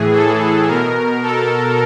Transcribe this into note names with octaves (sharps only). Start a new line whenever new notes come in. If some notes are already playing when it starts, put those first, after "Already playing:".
Already playing: A2 E3 G#4
A4
B2 A#4
A4